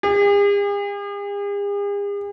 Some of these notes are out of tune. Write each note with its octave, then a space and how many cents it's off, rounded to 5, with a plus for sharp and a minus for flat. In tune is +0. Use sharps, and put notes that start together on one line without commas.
G#4 -45